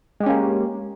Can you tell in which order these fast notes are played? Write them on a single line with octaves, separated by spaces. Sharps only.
G#3 G4 C#4 A#3